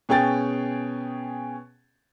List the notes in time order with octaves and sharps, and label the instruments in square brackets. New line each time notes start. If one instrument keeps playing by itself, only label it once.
[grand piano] B2 C#4 G#4 G5 A6